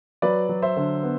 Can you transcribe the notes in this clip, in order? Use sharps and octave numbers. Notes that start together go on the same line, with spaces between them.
F#3 B4 D5
F#3
C5 E5
D3
B3